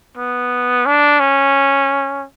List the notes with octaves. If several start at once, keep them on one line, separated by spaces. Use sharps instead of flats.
B3
D4
C#4